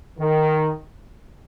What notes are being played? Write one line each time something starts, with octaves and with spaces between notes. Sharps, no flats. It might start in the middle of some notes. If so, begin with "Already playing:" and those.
D#3